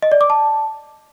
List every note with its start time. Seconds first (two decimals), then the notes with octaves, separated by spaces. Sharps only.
0.02 D#5
0.12 D5
0.21 D6
0.30 A5